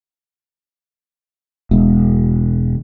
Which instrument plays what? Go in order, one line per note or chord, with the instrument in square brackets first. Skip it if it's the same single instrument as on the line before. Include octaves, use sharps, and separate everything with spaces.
[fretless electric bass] E1